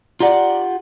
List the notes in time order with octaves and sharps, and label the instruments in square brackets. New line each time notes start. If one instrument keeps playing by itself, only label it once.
[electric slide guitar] F4 G4 F#5 [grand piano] D5 A#5